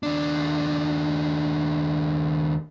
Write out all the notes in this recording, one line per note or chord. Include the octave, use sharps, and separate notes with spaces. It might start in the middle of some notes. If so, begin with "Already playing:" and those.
D#2 D4